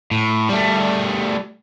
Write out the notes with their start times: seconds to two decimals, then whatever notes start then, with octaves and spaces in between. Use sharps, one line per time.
0.11 A2
0.49 G3 A3